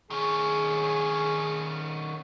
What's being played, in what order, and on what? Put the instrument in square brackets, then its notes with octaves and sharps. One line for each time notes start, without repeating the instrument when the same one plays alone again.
[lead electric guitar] D#3 C#4 [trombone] G#4